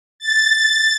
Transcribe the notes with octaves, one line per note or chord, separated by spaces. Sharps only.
A6